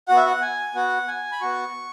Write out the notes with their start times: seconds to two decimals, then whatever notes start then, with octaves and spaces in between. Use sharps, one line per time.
0.08 B3 F#4 F#5
0.17 E5
0.26 F#5
0.41 G#5
0.75 B3 F#4 F#5
1.08 G#5
1.32 B5
1.41 B3 F#4 C#6